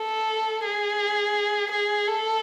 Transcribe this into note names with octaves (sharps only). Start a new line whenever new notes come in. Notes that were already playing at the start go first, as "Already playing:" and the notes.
Already playing: A4
G#4
G#4
A4